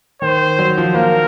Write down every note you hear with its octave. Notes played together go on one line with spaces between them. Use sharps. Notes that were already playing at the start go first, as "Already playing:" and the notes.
D#3 C5
F#3
F3
A#3 A#4